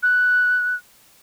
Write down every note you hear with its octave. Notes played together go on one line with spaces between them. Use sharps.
F#6